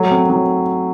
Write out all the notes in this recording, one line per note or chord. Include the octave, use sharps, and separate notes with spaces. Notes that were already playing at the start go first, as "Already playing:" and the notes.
Already playing: F#3 A3
C4
F#3